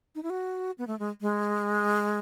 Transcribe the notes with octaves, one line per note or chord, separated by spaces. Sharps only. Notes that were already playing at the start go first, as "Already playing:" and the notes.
D#4
E4
F#4
B3
A3
G#3
G#3